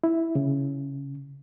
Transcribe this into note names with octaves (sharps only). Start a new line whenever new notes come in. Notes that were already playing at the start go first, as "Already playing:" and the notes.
E4
C#3